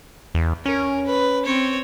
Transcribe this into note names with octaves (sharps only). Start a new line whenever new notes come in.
E2
C#4 A#4
B4
C4 C#5